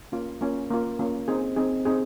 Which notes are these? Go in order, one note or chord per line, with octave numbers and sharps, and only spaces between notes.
A#3 C#4 F4
A#3 C#4 F4
A#3 C#4 F4
A#3 C#4 F4
C4 D#4 G#4
C4 D#4 G#4
C4 D#4 G#4